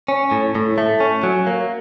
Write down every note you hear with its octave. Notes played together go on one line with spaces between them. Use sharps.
C#4
A2
A2
A3
C#4
F#3
A#3